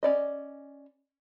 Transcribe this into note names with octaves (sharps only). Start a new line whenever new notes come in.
C#4 D5 D#5